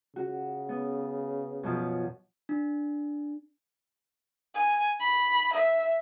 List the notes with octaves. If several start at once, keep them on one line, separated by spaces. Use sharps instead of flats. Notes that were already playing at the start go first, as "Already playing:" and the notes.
C#3 F#4
B3
F#2 B2 F3
D4
G#5
B5
E5